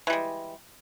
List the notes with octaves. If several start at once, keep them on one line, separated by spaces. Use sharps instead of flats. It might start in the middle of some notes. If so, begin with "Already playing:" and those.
E3 G3 G#3